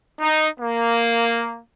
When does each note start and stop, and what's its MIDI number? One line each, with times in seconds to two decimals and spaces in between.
0.20 0.48 63
0.60 1.60 58